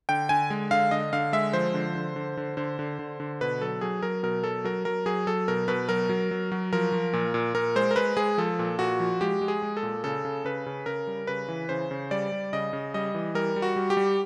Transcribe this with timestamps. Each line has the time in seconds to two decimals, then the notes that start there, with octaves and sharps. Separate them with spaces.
0.09 D3 G5
0.29 D3 G#5
0.50 G#3
0.71 D3 F5
0.91 D3 D#5
1.13 D3 F5
1.33 G#3 E5
1.53 F3 C5
1.74 D3
1.95 D3
2.16 D3
2.37 D3
2.57 D3 C5
2.79 D3
2.99 D3
3.20 D3
3.41 B2 B4
3.61 F#3 A4
3.81 F#3 G#4
4.02 F#3 A#4
4.23 B2 A#4
4.44 F#3 A4
4.64 F#3 A#4
4.85 F#3 A#4
5.06 F#3 G#4
5.27 F#3 A4
5.48 B2 A#4
5.68 B2 B4
5.89 F#3 A#4
6.09 F#3
6.31 F#3
6.52 F#3
6.73 F3 A#4
6.92 F3
7.13 A#2
7.34 A#2
7.54 A#2 A#4
7.76 G#3 C5
7.91 A#4
7.96 G#3 B4
8.17 G#3 G#4
8.38 F3 A4
8.59 A#2
8.79 A#2 F#4
9.00 F3
9.21 G#3 G4
9.41 G#3
9.48 G#4
9.63 G#3
9.77 A4
9.83 A#2
10.04 C#3 A4
10.25 C#3
10.45 C#3 B4
10.66 C#3
10.86 C#3 A#4
11.07 G3
11.27 C#3 B4
11.48 E3
11.69 C#3 C5
11.91 C#3
12.11 G3 D5
12.32 G3
12.53 C#3 D#5
12.73 C#3
12.94 G3 D#5
13.15 E3
13.35 G3 A#4
13.56 G3
13.62 F#4
13.76 G3
13.90 G4
13.97 G3